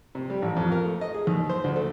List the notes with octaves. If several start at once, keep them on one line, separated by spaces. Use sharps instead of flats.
C3
G3
A1
F2
A#4
A3
D#5
G#4
D#2
C5
D2
A3